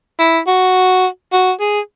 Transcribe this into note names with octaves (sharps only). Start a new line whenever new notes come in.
E4
F#4
F#4
G#4